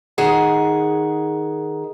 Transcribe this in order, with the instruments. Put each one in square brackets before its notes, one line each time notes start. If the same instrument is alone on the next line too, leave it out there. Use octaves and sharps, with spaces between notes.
[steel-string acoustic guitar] D#3 G#4 F#5